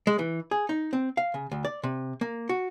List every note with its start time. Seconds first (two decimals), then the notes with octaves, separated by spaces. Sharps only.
0.07 G#3
0.19 E3
0.51 G#4
0.69 D#4
0.93 C4
1.17 F5
1.34 C#3
1.52 D2
1.65 D5
1.83 C3
2.21 A#3
2.49 F#4